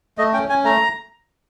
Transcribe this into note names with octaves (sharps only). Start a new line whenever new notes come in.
A3 D#5
C#4 G5
C#4 G#5
A3 A#5